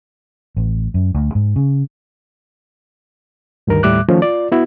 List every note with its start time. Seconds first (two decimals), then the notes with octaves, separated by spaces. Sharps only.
0.57 A1
0.94 F#2
1.15 D2
1.35 G#2
1.56 C#3
3.67 D2 G2 D#3 A#4
3.83 D#2 A2 G3 E5 D6 F#6
4.09 D#3 F3 A3 C#4
4.22 F4 D5
4.52 B3 E4 F#4